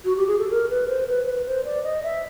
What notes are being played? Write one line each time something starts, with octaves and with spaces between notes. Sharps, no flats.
F#4
G4
G#4
A4
A#4
B4
C5
B4
C5
B4
C5
D5
D#5
E5